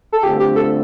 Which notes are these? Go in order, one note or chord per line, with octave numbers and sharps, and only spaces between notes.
A4
G2 D3 A3 C4 F4 G4
G4
A4